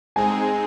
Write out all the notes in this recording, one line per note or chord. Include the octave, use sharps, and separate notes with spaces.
G#3 C4 D#4 G#4 G#5